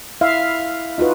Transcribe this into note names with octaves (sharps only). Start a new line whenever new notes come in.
E4 E5 F5
D#4 F4 F#4 B4